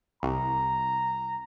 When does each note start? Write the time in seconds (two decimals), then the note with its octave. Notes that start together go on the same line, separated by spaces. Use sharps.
0.23 C2 A#5